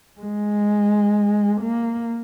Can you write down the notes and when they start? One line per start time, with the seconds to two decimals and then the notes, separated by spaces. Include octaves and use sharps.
0.21 G#3
1.61 A#3